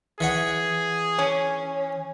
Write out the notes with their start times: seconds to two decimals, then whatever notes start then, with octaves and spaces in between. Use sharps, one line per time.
0.20 E3 G#4 C#5 F#5
1.19 C#4